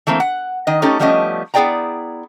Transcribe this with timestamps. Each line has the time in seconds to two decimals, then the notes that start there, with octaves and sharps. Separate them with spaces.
0.07 E3 A3 A#3 C4
0.20 F#5
0.67 D#3 D#5
0.82 A3 C#4 D#4 G4 A4
0.99 F3 G3 A3 B3 C#4 D#5
1.54 B3 E4 G#4 D5 G5 A#5